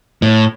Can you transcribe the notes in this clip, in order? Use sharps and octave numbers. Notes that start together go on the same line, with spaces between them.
A2